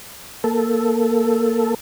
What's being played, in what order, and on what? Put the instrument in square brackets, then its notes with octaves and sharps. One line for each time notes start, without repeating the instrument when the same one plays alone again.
[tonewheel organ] A#3 A4